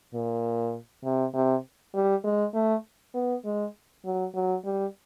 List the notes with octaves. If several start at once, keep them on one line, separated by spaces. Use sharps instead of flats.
A#2
C3
C3
G3
G#3
A3
B3
G#3
F#3
F#3
G3